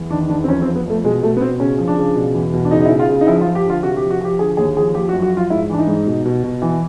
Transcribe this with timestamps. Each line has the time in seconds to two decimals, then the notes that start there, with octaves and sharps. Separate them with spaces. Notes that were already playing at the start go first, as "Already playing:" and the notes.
Already playing: E2
0.11 D#3 D4
0.29 E2 D4
0.44 C4
0.48 F2 C#4
0.62 C4
0.66 F3
0.75 B3
0.86 F2 A3
1.04 B2 G#3
1.23 B2 A3
1.37 B3
1.41 B2 C4
1.60 C#3 C#4
1.79 F3
1.88 D4
1.97 C#3
2.15 B2
2.34 E2
2.53 B2
2.65 D4
2.71 C#3 D#4
2.81 D#4
2.86 E4
2.90 C#3
2.99 F4
3.09 C#3
3.21 D#4
3.27 F3 E4
3.41 F4
3.46 F3
3.55 G4
3.65 D3 F4
3.83 C3 F#4
3.97 G4
4.02 F3
4.11 F#4
4.21 F3 G4
4.39 D3 G#4
4.57 D#2 G#4
4.76 F3 G#4
4.94 F3 G4
5.09 F#4
5.13 F#2
5.22 F#4
5.32 F3
5.37 F4
5.50 G#2 E4
5.70 E3 D4
5.79 D#4
5.87 G#2
6.07 B2
6.25 B2
6.44 B2
6.62 E3